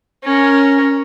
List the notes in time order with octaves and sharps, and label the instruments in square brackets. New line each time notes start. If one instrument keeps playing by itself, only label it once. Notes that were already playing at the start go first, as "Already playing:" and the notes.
[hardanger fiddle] C#4 A#4